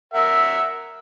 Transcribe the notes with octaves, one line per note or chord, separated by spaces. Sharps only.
A#4 E5 F#5 E6